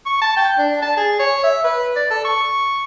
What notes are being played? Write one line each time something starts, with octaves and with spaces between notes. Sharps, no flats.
C#6
A5
G5
D4
A5
G#4
C#5
E5
B4
D5
A4
C#6